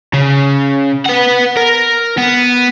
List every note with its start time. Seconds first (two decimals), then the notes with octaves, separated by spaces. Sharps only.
0.13 C#3
1.06 B4 F#5
1.57 A#4
2.17 B3